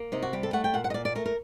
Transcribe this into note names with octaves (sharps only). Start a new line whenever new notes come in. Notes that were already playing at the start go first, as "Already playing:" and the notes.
Already playing: A#3
C3 D#4
F#4
G3 G4
A4
A3 F#5
G5
A#2 F#5
F#5
D#5
A#2 D5
D5
A3 A#4
A#4